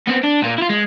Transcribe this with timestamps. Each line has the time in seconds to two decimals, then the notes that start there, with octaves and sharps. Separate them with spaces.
0.07 B3 C4
0.23 D4
0.42 A#2 A#3
0.58 E4 F4
0.69 G#3